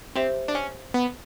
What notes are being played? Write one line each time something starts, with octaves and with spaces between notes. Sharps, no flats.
C4 G4 C5 E5
D4
C#4
B3